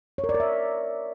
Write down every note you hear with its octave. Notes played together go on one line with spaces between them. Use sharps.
C#5
A#4
D5
A#4
E5